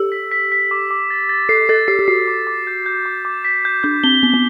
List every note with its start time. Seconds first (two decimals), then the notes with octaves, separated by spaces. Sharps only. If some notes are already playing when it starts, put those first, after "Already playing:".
Already playing: G4 A4 E6
0.12 B6
0.31 B6
0.52 B6
0.71 D6
0.91 D6
1.10 A6
1.29 A6
1.49 A4 C7
1.69 A4 A6
1.88 G4 C7
1.99 G4
2.08 F#4 C7
2.28 D6
2.47 D6
2.67 G6
2.86 G6
3.06 D6
3.25 D6
3.44 B6
3.65 G6
3.83 D4 G6
4.04 C4 G7
4.23 B3 G7
4.34 B3